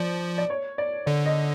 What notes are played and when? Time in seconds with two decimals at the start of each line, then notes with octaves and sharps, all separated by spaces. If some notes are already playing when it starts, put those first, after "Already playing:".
Already playing: F3 D5
0.38 D5
0.50 C#5
0.78 D5
1.06 D3 D5
1.26 D#5